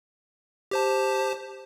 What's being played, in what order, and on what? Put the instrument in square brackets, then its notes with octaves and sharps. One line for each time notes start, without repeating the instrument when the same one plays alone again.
[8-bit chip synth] G4 C5 A5